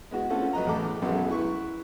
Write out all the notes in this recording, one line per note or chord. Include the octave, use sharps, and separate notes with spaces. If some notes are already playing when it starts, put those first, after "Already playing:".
G#3 B3 F#4
A3 C4 C#4 F4 A4 F#5
F#3 B4 D#5 A#5
E2 A2 A4 D6
B1 F#2 F#3 G#3 B3
E4 B4 C#6